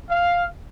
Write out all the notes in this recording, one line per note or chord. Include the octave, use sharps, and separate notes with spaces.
F5